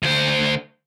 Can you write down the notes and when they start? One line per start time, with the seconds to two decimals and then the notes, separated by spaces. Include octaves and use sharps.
0.02 D2 C5